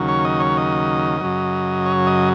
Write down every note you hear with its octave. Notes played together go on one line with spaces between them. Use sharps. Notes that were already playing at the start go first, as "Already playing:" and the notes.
Already playing: D#2 C#3 F#3
C#5
D#5
C#5
D#5
F#2 C#3 F#3
C#5
D#5